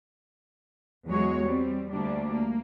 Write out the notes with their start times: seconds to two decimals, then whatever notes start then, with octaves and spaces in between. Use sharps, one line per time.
1.06 E2 F#3 G#3 F#4 C#5
1.42 G3 C4
1.91 D2 G3 A#3 D4
2.31 A#3